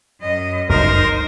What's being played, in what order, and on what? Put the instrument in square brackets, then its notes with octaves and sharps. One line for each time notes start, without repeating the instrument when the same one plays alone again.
[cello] F#2 D#5
[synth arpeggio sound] G1 C#2 F#2 [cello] D#4 C5 [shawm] A#4